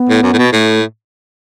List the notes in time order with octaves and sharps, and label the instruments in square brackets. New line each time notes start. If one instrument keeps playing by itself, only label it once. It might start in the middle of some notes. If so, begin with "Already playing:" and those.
Already playing: [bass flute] B3
[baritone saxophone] A2
F#2
A2
B2
[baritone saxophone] A2 [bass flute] A3